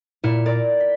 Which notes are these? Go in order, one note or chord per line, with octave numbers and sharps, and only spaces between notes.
A#2 E4 F6 C#7
A#4 D5 A6
B6